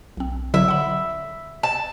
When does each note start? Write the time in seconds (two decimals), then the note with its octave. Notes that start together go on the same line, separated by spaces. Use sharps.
0.17 B1 C4
0.54 D3 F#3 E4 E5
0.68 F#5 B5
1.63 A5